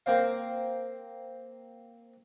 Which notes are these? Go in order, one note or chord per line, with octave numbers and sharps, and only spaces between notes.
A#3 C4 C5 F5